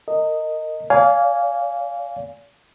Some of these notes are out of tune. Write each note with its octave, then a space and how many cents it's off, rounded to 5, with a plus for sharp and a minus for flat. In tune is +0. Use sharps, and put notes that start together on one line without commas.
A#4 -30 D#5 +0
D5 -40 F5 +0 G#5 +0